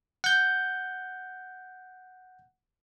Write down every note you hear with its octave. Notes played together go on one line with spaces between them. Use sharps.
F#5 G6